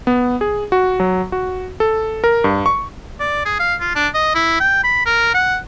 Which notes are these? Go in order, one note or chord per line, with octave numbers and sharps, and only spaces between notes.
B3
G#4
F#4
F#3
F#4
A4
A#4
G2
C#6
D5
G#4
F5
F4
D4
D#5
E4
G5
B5
A#4
F#5